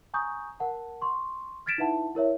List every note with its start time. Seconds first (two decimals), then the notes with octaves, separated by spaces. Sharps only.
0.14 G#5 A#5 C#6 D#6 G6
0.60 A#4 F#5 A5
1.02 C6 C#6
1.66 F6 G#6 A6 B6 D7 E7
1.78 D#4 E4 B4 E5 F#5 A5
2.15 E4 A#4 C#5 E5